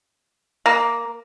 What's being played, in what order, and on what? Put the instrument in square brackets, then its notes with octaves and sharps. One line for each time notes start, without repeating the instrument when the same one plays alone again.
[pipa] A#3